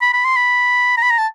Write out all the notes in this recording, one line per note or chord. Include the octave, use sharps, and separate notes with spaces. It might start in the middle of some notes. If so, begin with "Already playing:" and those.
B5
B5
C6
B5
A#5
B5
A#5
A5